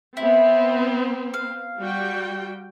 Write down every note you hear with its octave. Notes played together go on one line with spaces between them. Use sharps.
B3 C4 E4
F5
G3 F#4 G5